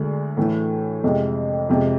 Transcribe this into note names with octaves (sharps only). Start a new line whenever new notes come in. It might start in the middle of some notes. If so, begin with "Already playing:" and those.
Already playing: D2 D3 G#3 D4 G#4
A2 E3 A3
F2 C3 G#3
F2 C3 G#3